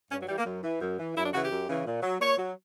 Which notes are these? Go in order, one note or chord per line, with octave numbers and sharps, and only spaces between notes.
G2 C#4
F#3
E3 G3
A#3
F#2
E3
F#2
E3
F#2 E4
D4
C#3 E3 F#4 G4
F#2
C#3 E3
A#2
F#3
A#2 C#5
F#3